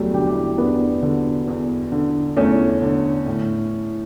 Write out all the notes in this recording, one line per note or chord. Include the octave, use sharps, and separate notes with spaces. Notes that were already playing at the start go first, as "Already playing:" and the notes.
Already playing: E2 F#3 G3 A3
D3 G4
E4 G4
E2 B3 D4
D3
E2
D3
E2 A3 C#4
D3
A2
E3